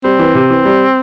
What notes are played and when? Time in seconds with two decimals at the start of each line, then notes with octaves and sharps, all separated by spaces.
0.04 G3 C4
0.19 E3
0.35 C3
0.50 E3
0.65 G3